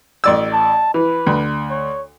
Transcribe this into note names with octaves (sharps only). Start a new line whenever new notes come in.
A1 D5 E6
A5
E3 B4
D2
C#5